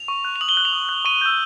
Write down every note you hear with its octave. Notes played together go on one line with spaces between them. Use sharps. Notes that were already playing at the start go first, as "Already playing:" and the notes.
Already playing: F7
C#6
F#6
F7
D#6 F#7
G7
F#6 F#7
F7
D#6
F#6
C#6 D#7
E6 G6